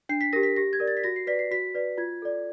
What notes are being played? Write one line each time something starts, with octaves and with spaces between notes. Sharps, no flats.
D4 C7
B6
G4 A#4 A#6
B6
G4 A#6
G#6
A#4 D5
A6
B6
F#4 A#6
C7
B4 D5 B6
C7
F#4 B6
B4 D5
F4 G#6
A4 D5